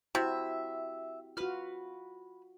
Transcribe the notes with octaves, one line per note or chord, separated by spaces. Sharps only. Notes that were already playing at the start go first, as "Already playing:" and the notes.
C3 E4 F#4 E5
F4 F#4 B4 F6